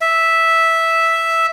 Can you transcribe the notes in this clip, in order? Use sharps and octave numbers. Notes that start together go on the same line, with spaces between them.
E5